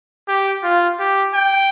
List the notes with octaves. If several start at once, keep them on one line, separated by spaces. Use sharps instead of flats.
G4
F4
G4
G5